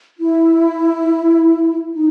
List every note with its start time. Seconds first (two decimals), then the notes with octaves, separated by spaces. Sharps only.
0.19 E4
1.94 D#4